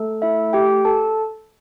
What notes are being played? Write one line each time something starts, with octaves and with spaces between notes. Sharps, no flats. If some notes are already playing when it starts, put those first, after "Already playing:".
Already playing: A3 A4
E4 E5
G4 G5
A4 A5